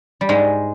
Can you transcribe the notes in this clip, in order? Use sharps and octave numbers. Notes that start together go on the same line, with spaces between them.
G3
G#2 G#3